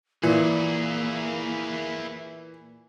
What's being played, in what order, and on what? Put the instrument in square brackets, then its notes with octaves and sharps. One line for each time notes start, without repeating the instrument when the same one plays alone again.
[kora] A#2 [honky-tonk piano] E3 [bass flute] A#3 [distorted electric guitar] E4 G#4